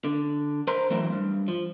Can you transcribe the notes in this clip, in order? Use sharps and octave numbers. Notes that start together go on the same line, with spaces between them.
D3
A#4 C5 A#5 C6
E3 F#3 A3 C4 E4
G2
F3